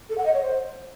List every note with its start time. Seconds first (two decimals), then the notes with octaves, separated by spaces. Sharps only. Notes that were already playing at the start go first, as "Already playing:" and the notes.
0.10 A4
0.18 F#5
0.26 D#5
0.34 C#5
0.42 C5